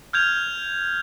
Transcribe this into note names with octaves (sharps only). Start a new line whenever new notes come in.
F6 G6 G#6 F7